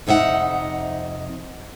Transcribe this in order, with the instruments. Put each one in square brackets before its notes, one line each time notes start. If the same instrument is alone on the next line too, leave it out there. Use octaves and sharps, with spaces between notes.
[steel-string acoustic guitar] F2 C3 D#4 E5 F#5